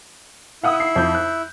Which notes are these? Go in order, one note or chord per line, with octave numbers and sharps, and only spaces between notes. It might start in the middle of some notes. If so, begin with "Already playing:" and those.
E4 F5 F#5 D#6
C7
F2 G6
F#6